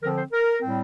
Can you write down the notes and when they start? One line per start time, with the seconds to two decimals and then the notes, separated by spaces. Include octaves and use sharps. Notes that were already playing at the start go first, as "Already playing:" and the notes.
0.01 D3 F3 C4 A#4
0.16 C5
0.32 A#4
0.61 A2 G3 C4